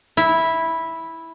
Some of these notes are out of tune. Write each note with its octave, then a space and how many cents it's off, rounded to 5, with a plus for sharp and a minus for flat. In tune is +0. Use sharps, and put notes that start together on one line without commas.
E4 -10